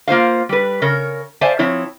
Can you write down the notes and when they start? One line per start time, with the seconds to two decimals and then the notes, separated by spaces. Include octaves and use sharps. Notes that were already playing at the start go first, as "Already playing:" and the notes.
0.08 A#3 F4 C5 F5
0.49 G3 B4
0.82 C#3 A#4 C#5
1.41 C5 D5 E5 F5 G#5 A5
1.59 F3 C4 E4 C#5